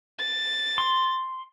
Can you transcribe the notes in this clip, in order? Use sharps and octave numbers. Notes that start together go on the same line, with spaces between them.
A6
C6